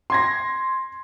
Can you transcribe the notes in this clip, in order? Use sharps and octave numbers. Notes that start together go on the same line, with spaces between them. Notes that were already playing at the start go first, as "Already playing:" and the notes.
C6 G#6 A#6